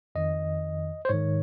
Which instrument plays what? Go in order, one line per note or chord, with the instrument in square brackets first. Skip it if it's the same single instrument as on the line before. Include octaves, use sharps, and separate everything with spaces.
[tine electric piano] F2 D#3 D#5
C5
G#2 D#3 C#5